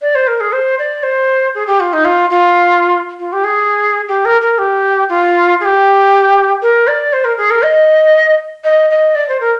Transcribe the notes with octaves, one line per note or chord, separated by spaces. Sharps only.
D5
C5
A#4
G#4
C5
D5
C5
G#4
G4
F4
D#4
F4
F4
F4
G4
G#4
G4
A#4
A#4
G4
F4
G#4
G4
A#4
D5
C5
A#4
G#4
A#4
D#5
D#5
D#5
D5
C5
A#4